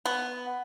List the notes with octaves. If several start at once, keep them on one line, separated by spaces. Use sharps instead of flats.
B3